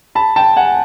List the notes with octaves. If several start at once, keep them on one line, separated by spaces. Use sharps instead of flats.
A5 B5
G5 A5
F#5 G#5